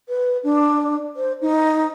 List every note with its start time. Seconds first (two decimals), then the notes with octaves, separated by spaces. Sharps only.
0.08 B4
0.43 D4
1.16 C5
1.41 D#4